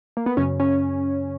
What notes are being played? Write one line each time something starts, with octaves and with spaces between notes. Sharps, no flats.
A#3
B3
F#2 C#3 C#4
C#4